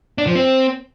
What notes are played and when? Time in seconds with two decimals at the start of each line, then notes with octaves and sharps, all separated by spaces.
0.18 D4
0.27 F3
0.35 C4